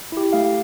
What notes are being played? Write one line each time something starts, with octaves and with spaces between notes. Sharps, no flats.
E4 G4
A3 F5